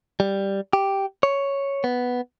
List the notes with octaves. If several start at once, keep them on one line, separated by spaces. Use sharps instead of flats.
G3
G4
C#5
B3